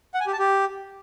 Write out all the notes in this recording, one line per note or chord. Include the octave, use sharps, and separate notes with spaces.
F#5
G#5
G4
A5
G4